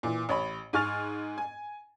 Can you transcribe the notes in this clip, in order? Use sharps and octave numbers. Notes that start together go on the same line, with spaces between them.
A#2 E3
A1 C#5 B5
G#2 G#5 C#6 F6 A6 F7
G#5